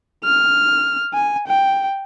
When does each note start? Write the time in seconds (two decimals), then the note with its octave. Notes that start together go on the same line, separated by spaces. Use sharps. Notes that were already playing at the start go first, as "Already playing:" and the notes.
0.24 F6
1.14 G#5
1.48 G5